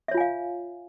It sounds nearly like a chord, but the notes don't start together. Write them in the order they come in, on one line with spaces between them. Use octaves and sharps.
E5 C#5 F4 G#5 F5